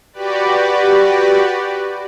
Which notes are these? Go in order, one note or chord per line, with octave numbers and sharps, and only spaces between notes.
F#4 G4 B4 D5